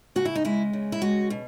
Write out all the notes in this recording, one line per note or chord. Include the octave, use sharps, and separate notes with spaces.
C#3 F#4
E4
D#4
G#3 E4
C#3
E4
G#3 F#4
B2